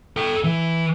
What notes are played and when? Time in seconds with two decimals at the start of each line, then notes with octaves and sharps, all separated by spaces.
0.17 A4 G5
0.44 E3